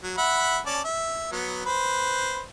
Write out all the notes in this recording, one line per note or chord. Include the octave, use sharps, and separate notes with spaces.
F#3
E5 F#5 B5
C#4 D5 A5
E5
F#3 B3
B4 C5